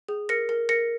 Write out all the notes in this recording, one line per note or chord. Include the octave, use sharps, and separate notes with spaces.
G#4
A#4 A#6 C#7
A#4
A#4 A#6 C#7